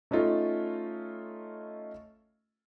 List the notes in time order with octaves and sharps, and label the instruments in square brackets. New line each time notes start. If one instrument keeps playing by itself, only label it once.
[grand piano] A3 C#4 D#4 F4 A4